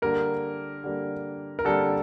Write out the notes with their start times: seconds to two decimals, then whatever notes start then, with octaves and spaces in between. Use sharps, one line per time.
0.02 D3 G3 A#3 A#4
0.84 D3 G3 A#3
1.59 A#4
1.65 D3 G3 A#3 A4